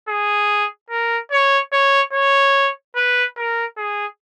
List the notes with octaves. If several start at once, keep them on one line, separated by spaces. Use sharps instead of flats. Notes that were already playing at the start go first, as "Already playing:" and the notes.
G#4
A#4
C#5
C#5
C#5
B4
A#4
G#4